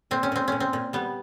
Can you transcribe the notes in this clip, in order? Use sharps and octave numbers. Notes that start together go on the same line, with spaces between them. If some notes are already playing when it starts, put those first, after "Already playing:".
A#2 C4
C#4
A#2 C4
A#2 C#4
C4
A#2
G3 B3